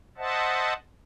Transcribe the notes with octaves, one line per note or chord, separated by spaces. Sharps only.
C5 D#5 E5 F#5 A5